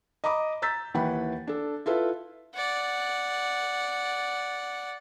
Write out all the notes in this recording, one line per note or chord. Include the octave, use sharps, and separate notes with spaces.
D#5 A#5 B5 D6 D#6
A#5 E6 G6 A6 B6
D#2 E3 F#5 G5 B5
D4 A4
E4 F4 A4 B4
D5 F#5